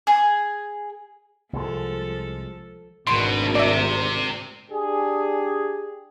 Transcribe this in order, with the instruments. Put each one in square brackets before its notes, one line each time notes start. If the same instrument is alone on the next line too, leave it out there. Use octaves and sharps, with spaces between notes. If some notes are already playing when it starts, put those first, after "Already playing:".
[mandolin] G#4
[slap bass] C2 G#3 [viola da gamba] F3 A4
[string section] G#1 D2 A#4 [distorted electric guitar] B2 [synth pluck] C6 D7
[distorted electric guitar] C3 [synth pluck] D5 E5
[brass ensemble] D4 G4 G#4